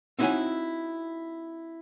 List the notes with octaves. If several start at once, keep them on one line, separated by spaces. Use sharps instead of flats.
C4 D#4 E4 F#4 C#5 G#5